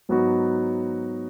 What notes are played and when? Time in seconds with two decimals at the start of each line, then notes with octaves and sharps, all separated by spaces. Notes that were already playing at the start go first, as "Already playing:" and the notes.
0.09 G#2 F#3 B3 D#4 F#4